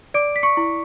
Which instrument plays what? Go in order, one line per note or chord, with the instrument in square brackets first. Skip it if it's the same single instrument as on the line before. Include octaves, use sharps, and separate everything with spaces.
[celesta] D5 D6 D7
B6
C#6 C#7
E4